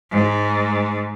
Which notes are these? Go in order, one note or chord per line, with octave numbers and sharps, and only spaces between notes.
G#2